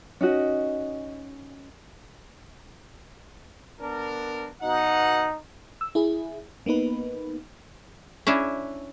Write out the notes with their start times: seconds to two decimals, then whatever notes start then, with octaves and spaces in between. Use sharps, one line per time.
0.21 C#4 D#4 F#4 D#5
3.81 B3 D4 A#4
4.62 B2 D#4 F#5
5.81 E6
5.95 E4 G#4
6.66 A#3 B3 D#4 B4
8.27 C#4 D4 E4